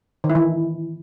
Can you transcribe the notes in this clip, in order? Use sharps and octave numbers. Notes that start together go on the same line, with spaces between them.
D#3
E4
E3